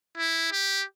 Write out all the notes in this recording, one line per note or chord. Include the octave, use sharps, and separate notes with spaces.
E4
G4